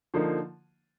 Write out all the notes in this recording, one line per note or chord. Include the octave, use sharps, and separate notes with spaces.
D3 F3 A#3 D#4